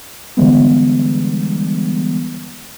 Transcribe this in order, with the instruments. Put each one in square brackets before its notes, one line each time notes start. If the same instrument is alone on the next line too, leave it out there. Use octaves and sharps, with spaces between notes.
[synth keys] D3 E3 G3 G#3 B3